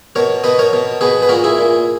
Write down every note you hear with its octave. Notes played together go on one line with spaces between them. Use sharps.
B2 A#4 C#5
B2 B4 D#5
A#4 C#5
B2
B2 G#4 B4
B4
A#2 F#4 A#4
E4 G#4
A#2